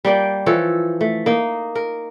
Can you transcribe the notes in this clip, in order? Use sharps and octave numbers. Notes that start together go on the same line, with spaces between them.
G3 A#3 D5 G5
E3 F3 A4 C#5
A3
A#3 D#4
A#4